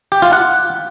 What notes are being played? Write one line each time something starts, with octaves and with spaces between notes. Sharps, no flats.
G4
F4
F#5